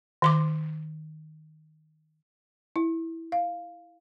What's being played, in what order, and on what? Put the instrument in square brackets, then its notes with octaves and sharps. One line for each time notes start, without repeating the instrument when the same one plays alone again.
[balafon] D#3 C6 D6
E4
F5